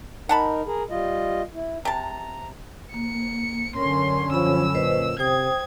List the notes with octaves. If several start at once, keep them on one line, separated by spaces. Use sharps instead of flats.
D#4 A#4 F#5 A5 B5
G#4 A#4
G3 F4 D#5
E4
C3 A5 A#5
A#3 C#7
F#2 D3 C#4 A#4 C6
F3 B5 E6
A#2 B4 C5 D#5
C3 C5 G5 D#6 G#6